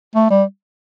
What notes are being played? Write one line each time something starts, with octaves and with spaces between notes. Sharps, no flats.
A3
G3